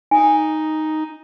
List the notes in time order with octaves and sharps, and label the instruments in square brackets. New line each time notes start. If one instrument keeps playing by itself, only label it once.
[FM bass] D#4 [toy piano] G#5